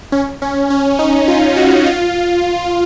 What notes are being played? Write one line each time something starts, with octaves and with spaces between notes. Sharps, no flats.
C#4
C#4
C#4
D#4
F4
F#4
F4